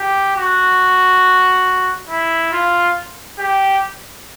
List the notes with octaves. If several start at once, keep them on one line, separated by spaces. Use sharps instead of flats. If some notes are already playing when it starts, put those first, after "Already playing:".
Already playing: G4
F#4
E4
F4
G4